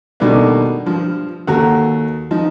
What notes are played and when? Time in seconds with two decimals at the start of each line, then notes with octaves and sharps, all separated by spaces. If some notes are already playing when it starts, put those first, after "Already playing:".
0.20 B2 D#3 G3 A3 A#3 D4
0.86 G2 F3
1.48 D#2 F#4 A4 A#5
2.31 F3 D#4